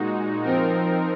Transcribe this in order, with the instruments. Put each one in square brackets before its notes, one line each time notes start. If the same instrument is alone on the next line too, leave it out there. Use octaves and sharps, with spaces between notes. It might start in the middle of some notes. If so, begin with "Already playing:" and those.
Already playing: [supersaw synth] A#2 G#3 D#4 F#4
F3 C4 D#4 A#4